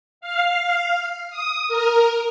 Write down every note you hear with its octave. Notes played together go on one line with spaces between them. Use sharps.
F5
D#6
A#4